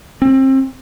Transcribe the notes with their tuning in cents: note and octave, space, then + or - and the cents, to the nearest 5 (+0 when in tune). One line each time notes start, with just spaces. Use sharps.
C4 +30